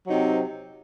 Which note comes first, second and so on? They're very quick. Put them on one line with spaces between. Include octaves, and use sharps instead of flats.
F#3 D#4 C3 C4